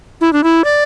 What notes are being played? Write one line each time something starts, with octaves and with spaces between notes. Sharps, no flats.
E4
D4
E4
D5